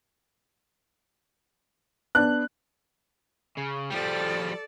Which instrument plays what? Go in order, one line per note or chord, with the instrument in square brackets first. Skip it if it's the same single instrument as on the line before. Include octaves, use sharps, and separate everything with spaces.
[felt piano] B3 D4 [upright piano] F#6
[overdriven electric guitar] C#3
[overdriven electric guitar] F3 G3 [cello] A4 D5